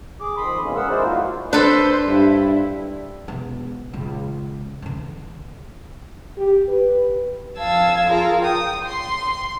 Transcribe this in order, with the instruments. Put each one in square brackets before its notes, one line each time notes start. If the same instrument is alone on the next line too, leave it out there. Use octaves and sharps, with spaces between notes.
[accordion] G#4 D6
F2 D#3 B5 C6 D#6
B2 D#3 E3 G#3 A#3 C#4
F#2 G#3 G#4 A#4 F#5 E6
D#4 E4 F#4 G#4 C5 D5
F#3 G#3 A#3 F4 F#4
[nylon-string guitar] D4 [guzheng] A4 B4 [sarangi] C5
[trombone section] G2 [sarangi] E4
[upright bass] E1 B3
C#2 A#2
D3 E3
[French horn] G4
B4
[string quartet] F2 F5 A5 E6 G#6
F4 G#4 A#4 F5
G5 D#6
C6